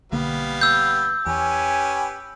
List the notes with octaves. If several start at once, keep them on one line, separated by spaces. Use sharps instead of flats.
B1 D3 G3 A#3 B3 F5
E6 G6
E2 C#4 G4 B4 G#5